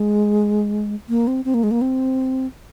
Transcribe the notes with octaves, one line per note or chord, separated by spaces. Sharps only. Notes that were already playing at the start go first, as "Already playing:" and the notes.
Already playing: G#3
A#3
C4
C4
A#3
G#3
A#3
C4